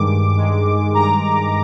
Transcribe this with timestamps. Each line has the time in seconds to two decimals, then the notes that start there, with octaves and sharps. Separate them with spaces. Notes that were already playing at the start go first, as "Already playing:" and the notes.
Already playing: G2 D#3 G#3 D6
0.38 G2 D#3 G#3
0.94 G2 D#3 G#3 A#5